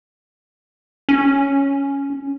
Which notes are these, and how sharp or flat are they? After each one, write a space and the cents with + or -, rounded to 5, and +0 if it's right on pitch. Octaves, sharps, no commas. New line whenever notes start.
C#4 +5